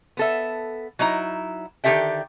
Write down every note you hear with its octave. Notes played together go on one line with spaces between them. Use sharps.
B3 A4 E5
F#3 D#4 E4 A#5
D3 D#3 G4 A4 E5 G5